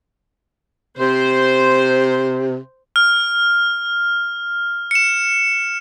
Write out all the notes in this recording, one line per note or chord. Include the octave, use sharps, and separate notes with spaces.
C3 C5
F6
C#7 E7